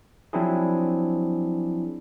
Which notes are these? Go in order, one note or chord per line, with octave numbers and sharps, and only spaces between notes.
F3 F#3 C4 D4 E4 G#4